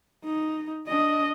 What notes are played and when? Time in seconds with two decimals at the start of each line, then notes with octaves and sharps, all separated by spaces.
0.25 D#4
0.87 D4 D#5